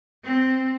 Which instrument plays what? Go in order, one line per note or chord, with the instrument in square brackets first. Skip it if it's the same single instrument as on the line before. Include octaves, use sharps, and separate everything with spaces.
[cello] C4